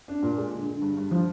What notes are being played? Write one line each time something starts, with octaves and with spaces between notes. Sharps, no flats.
D4
A#2
G#3
D3
D3
G2
G2
F3